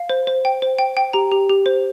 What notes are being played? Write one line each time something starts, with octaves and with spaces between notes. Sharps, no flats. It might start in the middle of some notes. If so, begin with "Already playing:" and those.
Already playing: F5
C5
C5
G5
C5
G5
G5
G4 A#5
G4
G4
C5